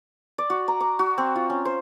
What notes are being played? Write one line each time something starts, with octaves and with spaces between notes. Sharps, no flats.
D5
F#4
A#5
D6
F#4
C4
F4
C#4
C5